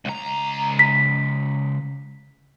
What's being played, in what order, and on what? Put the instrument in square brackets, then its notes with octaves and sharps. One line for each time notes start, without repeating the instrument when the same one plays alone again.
[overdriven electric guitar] C#2 A#5
[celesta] B6